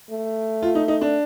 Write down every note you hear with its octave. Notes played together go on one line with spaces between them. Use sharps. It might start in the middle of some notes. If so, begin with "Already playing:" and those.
A3
F4
D#4
D#4
D4